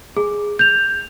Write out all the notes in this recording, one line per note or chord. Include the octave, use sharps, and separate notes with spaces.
G#4
G6 F7